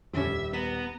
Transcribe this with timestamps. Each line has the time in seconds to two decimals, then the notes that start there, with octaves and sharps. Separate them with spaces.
0.13 D#1 F2 D3 G3 C#4 G4 E5
0.53 B3 A#5 B6 E7